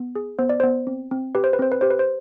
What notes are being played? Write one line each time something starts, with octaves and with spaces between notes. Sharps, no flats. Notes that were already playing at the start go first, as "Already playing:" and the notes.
Already playing: B3
G#4
B3 C5
D5
B3 C5
C4
C4
G4 B4
C5
B4
C4 C5
B4
G4 C5
B4
C5